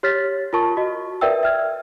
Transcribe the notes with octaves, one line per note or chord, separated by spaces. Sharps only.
G4 C#5 F6 A6 B6
F4 A#4 A5 C#6
F#4 D#5
A#4 B4 D5 E5 G5 E6
E5 F6 G#6